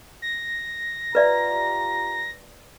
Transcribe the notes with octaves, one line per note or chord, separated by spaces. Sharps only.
A#6
F4 G4 B4 D5 E5 A#5